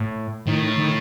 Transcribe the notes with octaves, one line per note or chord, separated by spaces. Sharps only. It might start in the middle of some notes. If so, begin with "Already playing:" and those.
Already playing: A2
A2 D#3
D#3